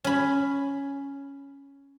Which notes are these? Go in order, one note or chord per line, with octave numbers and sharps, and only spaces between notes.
C#4 B5